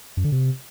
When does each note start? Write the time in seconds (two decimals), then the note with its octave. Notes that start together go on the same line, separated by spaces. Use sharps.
0.17 F#2
0.24 D3
0.32 C3